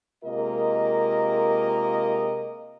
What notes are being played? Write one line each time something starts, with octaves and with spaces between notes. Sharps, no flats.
C3 G#3 A#3 F4 A#4 D#5